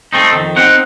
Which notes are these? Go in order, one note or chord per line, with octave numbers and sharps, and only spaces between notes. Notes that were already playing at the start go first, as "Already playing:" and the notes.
A3 C4 D#4
F2 D#3
C4 D#4 F#5